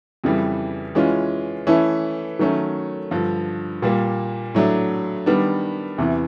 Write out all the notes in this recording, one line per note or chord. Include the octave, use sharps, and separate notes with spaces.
F2 C#3 E3 G3
E3 G#3 C#4 F4
E3 A3 C#4 E4 A4
D#3 F#3 A3 C#4
G2 D3 F3
A#2 G3 A#3
A2 F#3 A3 D4
D#3 G3 B3 D4
E2 C3 E3